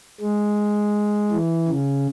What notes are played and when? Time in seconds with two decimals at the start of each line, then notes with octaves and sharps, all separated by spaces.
0.20 G#3
1.31 E3
1.68 C#3